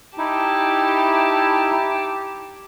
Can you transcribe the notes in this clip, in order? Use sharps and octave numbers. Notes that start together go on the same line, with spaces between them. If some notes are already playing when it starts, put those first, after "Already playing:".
D#4 E4 G4 A5